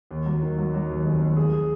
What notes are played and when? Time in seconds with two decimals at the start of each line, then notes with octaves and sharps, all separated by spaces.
0.11 D#2
0.26 F#3
0.42 D#3
0.58 F#3
0.74 F#3
0.89 D#2
1.05 F1
1.21 D#2
1.36 G#4
1.52 G#4